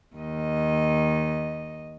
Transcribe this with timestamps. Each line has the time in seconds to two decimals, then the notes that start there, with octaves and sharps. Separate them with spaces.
0.15 D#2 D#5